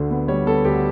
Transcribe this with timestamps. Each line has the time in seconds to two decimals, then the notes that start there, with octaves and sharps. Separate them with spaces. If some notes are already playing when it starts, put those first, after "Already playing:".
Already playing: D2 D3
0.10 B3
0.28 G3 C#5
0.46 B3 A4
0.65 D2 G4